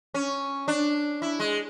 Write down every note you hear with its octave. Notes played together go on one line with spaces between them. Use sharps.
C#4
D4
E4
G#3